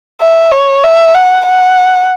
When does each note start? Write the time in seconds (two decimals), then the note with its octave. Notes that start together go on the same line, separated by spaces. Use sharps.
0.21 E5
0.52 C#5
0.84 E5
1.15 F#5
1.46 F#5